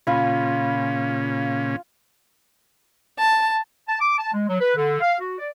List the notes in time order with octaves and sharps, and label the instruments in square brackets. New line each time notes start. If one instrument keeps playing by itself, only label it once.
[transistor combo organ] A#2 C#3 C#4 [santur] F4 G#5 B5
[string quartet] A5
[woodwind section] A5
D6
A5
G#3
F#3
B4
D3
F5
F#4
D5